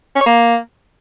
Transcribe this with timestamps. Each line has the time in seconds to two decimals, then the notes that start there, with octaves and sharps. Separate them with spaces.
0.16 C#4
0.21 C#5
0.26 A#3